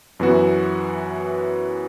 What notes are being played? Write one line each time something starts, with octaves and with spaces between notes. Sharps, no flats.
F#2 E3 B3 F#4